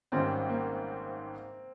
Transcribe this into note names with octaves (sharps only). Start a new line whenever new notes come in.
G#1 G#2 D#3 G3 C4 C#4
A#3